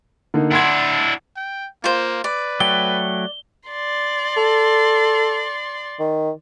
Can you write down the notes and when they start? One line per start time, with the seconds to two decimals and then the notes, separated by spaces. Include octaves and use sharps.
0.34 D3 A#3 D#4
0.51 D4 E4 F#5 C6 G#6
1.37 G5
1.84 A#3 F4 C5
2.24 B4 D5
2.60 F#3 A3 G5 G7
3.69 D5 C6
4.37 A4
5.99 D#3